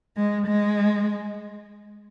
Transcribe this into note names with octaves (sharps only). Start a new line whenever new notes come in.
G#3
G#3